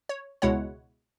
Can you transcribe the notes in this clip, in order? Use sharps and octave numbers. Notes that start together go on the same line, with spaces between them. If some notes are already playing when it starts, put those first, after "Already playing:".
C#5
C#2 B2 G#3 E4 C#5 F#5